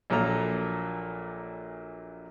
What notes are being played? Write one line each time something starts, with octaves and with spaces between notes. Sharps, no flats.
A#1 A#2 F#3 A#3 A4 A#5